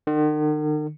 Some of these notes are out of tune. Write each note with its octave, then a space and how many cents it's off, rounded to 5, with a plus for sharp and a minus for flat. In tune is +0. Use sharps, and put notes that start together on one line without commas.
D#3 -45